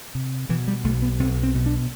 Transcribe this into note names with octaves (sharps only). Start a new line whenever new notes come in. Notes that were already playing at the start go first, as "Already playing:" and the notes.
C3
B2 E3
G3
B1 A3
B3
B1 C4
C4
B2
D4